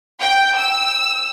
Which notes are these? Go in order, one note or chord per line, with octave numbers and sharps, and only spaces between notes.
G5
E6